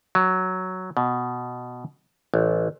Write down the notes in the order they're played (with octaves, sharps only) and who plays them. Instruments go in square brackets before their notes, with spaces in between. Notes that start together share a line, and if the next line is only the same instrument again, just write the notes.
[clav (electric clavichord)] F#3
B2
A1